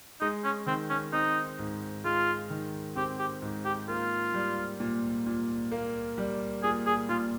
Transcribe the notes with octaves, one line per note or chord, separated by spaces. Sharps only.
G#3 D#4
C#4
D#3 C4
C#4
C4 D#4
G#2
G#3 F4
D#3
C4 G4
G4
G#2
G4
A#3 F4
G3
A#2
A#2
A#3
G3
A#2 G#4
G#4
A#2 F4